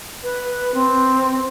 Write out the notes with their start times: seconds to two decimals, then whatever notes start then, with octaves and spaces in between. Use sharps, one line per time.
0.23 B4
0.74 C4